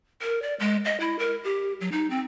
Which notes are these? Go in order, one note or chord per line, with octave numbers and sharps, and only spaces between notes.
A#4
D5
G#3
D#5
E4
A#4
G4
F#3
D#4
C4